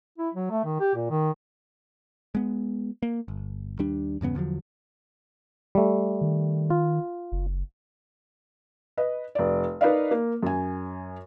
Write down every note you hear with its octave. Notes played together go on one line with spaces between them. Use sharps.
E4
F#3
A3
D#3
G4
A#2
D#3
G#3 B3
A#3
G1
D#2 G3 D4
E2 G2 C#3 B3
E2 D3 F3 F#3
G3 A3
D#3
F4
F#1
B4 D#5
F1 D5
D#4 A#4 B4 D5 D#5 F5
A#3
F#2 G#5